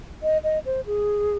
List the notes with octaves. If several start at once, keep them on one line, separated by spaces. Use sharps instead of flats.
D#5
D#5
C5
G#4